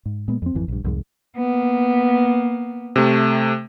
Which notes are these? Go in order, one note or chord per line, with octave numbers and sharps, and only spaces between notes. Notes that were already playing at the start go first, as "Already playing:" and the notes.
G#2
A#2 G#3 B3
F2 C4
G#1 F2 E3
A#1 G2
C2 F2 G#2 G#3
A#3 B3
C3 A3